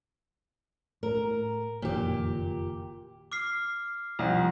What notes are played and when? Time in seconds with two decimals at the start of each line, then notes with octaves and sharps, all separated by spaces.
1.03 A2 A#4
1.82 F#1 F2 A#2 D#3 G4
3.32 D6 F6 C7
4.19 C2 F2